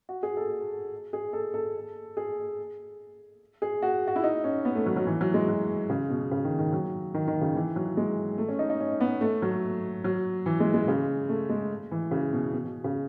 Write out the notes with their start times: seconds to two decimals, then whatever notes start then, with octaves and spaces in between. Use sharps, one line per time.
0.09 F#4
0.23 G#4
0.37 A4
1.13 G#4
1.33 A4
1.54 A4
2.17 G#4
3.62 G#4
3.82 F#4
4.07 F#4
4.16 E4
4.24 D#4
4.44 C#4
4.65 B3
4.76 A3
4.86 F#3
4.96 F#3
5.07 E3
5.21 F#3
5.34 G#3
5.48 F#3
5.90 C#3
6.10 B2
6.31 C#3
6.45 D#3
6.59 D#3
6.73 F#3
7.14 D#3
7.27 D#3
7.41 C#3
7.56 E3
7.76 F#3
7.97 G#3
8.38 A3
8.48 C#4
8.59 D#4
8.70 D#4
8.80 C#4
9.00 B3
9.21 A3
9.42 F#3
10.04 F#3
10.46 E3
10.60 G#3
10.74 G#3
10.88 C#3
11.29 A3
11.50 G#3
11.91 E3
12.11 C#3
12.33 B2
12.53 B2
12.64 B2
12.84 C#3